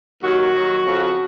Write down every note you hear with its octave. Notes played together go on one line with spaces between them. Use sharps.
D#2 D#3 F#3 F#4
D#2 D#3 F#3
F2 C#3 F3